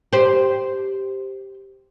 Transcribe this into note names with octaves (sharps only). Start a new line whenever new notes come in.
G4 C5